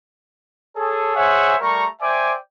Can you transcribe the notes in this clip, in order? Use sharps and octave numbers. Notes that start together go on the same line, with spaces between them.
G#4 A4 C#5
G#4 C5 C#5 E5 F#5 G#5
G3 A3 A#4 A#5 C#6
C5 D5 E5 G5 G#5 D6